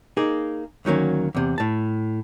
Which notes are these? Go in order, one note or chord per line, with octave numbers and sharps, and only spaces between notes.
A#3 D#4 G#4
D2 D#3 F#3 A#3 C#4
E2 C3
A2 A5